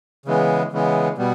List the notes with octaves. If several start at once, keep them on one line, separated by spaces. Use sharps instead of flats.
C#3 E3 G#3 B3
C#3 E3 G#3 B3
B2 G3 B3